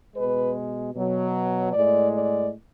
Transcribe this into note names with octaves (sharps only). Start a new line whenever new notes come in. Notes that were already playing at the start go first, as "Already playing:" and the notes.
B2 G#3 B4
B2 F#3
A2 G#3 D5
D5